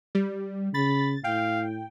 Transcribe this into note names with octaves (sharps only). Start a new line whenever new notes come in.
G3
C#3 B5 A6
A2 F5 G5